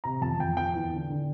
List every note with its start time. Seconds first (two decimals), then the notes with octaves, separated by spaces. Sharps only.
0.04 C3 A#5
0.21 F2 A5
0.39 F2 G5
0.57 F3 G5
0.75 E2
0.93 D3
1.10 D3